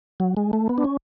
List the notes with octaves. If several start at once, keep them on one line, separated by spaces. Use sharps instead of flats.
F#3
G#3
A3
B3
D4
C#4